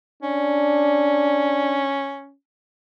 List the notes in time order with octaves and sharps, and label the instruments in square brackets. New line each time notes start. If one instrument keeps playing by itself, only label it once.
[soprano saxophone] C#4 [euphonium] D4